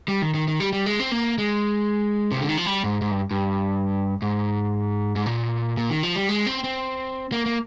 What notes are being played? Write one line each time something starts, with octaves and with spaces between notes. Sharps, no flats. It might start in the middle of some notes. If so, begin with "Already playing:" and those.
G3
D#3
D#3
D#3
G3
G3
G#3
C4
A#3
G#3
C3
D3
D#3
F3
G3
G#2
G#2
G2
G2
G#2
G#2
A#2
A#2
D#3
F3
G3
G#3
C4
C4
A#3
A#3